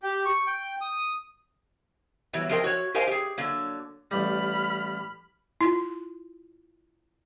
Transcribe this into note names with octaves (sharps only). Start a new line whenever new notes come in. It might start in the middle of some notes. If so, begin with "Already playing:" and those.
G4
C#6
G5
D#6
E3 F#3 G3 B3
F3 C4 G#4 A#4 D#5 G5
F#4 C#5
G4 A#4 C5 D#5 F5 G#5
G4 G#4
D3 F#3 A#3
A1 G3 B5 F6
E4 F4